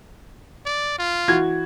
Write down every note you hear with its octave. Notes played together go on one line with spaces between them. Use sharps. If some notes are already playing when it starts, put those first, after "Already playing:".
D5
F4
E3 F#4 G#6